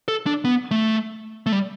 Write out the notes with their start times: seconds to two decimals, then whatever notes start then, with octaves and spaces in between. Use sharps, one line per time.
0.08 A4
0.26 D4
0.45 B3
0.71 A3
1.46 A3
1.52 G3